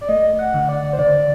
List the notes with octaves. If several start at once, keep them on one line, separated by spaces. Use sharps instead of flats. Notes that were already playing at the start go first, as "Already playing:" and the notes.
D5
A3 D#5
F#5
D3
D5
C5
D3 D5